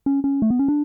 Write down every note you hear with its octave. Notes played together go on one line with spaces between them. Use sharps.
C#4
C#4
A3
B3
C#4
D4